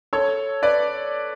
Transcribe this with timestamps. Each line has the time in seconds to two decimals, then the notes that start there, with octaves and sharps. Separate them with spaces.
0.13 A4 C#5
0.62 B4 D5